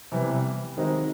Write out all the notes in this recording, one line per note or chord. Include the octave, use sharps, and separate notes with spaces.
C3 E3 G3 B3
D#3 G#3 C4 D#4 F#4